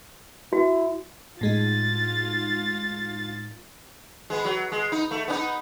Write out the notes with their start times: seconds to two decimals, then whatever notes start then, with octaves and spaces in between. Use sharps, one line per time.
0.53 E4 F#4
1.41 A2 G#3 D#4 F4 A6
4.30 G#3 B3
4.45 F#3
4.72 G#3
4.92 D#4
5.11 A3
5.28 B3 C#4 D#4